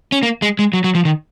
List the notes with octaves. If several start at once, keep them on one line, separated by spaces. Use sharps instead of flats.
C#4
A#3
G#3
G#3
F#3
F#3
F3
D#3